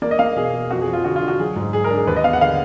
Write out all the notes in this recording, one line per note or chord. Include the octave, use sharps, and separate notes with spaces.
A#3 D5
D#5
A#3 F5
B2 G#4
B2
F2 F#4
G#4
F3
F4
D3 F#4
F4
D3
F#4
F#3 G#4
G#2
G#2 G#4
A#4
D4
G#4
D#2 B4
D#5
B3 F5
F#5
D3 F5